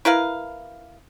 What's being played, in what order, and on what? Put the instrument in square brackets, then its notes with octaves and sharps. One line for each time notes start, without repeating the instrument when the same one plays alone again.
[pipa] E4 A#4 B4 F5